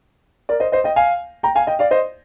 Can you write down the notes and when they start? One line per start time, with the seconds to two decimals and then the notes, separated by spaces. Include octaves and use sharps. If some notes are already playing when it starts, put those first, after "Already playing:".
0.49 A#4 D5
0.60 C5 D#5
0.72 C5 D#5
0.84 D#5 G5
0.96 F5 G#5
1.43 G5 A#5
1.55 F5 G#5
1.67 D#5 G5
1.79 D5 F5
1.91 C5 D#5